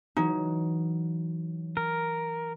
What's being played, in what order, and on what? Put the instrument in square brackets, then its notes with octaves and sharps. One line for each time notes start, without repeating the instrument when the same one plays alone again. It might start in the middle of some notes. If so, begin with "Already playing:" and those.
[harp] E3 F#3 [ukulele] D#4
[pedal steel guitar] A#4